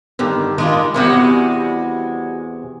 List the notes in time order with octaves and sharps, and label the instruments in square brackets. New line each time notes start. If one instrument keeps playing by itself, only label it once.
[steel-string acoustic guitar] G2 D3 D#3
[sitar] D#3 [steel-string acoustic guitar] G#3 D4 F4
[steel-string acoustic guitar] E2 C3 G#4 [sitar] G3 G#3 F#4